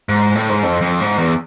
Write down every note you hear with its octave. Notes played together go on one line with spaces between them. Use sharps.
G#2
A2
G#2
F2
F2
G#2
E2